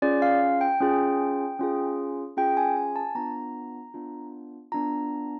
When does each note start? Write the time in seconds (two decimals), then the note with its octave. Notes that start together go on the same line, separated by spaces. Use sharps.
0.02 C#4 F4 G#4 D5
0.22 F5
0.61 G5
0.80 C#4 F4 G#4
1.59 C#4 F4 G#4
2.37 C#4 F4 G#4 G5
2.57 G#5
2.77 G#5
2.96 A5
3.15 B3 D4 F4 A#5
3.94 B3 D4 F4
4.72 B3 D4 F4 A#5